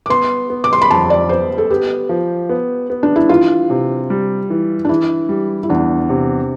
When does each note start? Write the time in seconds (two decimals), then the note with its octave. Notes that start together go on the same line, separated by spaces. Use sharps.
0.06 D6
0.10 B3 C6
0.50 B3
0.64 D6
0.73 C6
0.82 B5
0.91 F2 A5
1.10 D5
1.29 B3 C5
1.58 A4
1.70 B3 G4
2.09 F3
2.49 B3
2.90 B3
3.03 D4
3.16 E4
3.29 E3 F4
3.70 C3
4.10 G3
4.50 E3
4.85 D4
4.89 E3 E4
5.29 G3
5.63 E4
5.70 E2 D4
6.09 C3